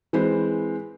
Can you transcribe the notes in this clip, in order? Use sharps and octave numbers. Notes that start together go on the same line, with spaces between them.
E3 G#3 C4 B4 C5